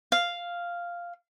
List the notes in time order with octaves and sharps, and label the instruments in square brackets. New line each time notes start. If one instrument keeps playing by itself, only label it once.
[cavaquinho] F5